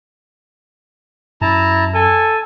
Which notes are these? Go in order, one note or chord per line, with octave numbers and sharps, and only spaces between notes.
F#2 E4 A5 A#5
A4 G#5